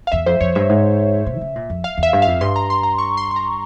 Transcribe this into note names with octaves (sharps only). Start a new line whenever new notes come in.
F5
E2 E5
F2 C5
F2 C#5
G2 E5
G#2
A#2
E3
C#3
A#2
F2
F5
E2
E5
G2
F5
F2
G2 C6
A#5
C6
A#5
C#6
C6
C6
A#5